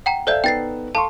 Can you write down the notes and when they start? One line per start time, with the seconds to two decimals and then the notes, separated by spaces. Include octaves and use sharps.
0.06 F#5 G5 A#5
0.27 A4 C5 D5 E5 F5 G6
0.44 B3 D#4 A4 G5 A6 C7
0.95 A4 F5 A5 C6 C#6